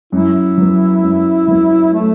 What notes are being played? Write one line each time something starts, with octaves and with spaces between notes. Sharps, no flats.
F#2 E4
F#3 B3
F#2
F#3 B3
A3